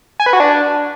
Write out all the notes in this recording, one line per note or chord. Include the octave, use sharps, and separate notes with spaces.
G#5
B4
F#4
D4